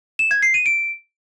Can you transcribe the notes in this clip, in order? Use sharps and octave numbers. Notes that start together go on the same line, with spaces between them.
E7
G#6
C7
D#7
D7